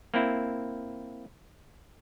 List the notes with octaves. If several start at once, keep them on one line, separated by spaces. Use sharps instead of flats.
A#3 C4 E4